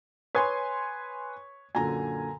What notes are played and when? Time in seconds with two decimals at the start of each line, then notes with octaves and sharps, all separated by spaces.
0.35 B4 C#5 G#5 C6 D#6 G#6
1.75 F#2 A#2 D3 G#5 A#5